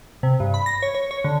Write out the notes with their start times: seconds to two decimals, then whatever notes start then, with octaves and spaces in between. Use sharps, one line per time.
0.23 C3
0.40 G2
0.54 B5
0.66 A#6
0.82 C#5
0.95 C#5
1.11 C#5
1.24 D3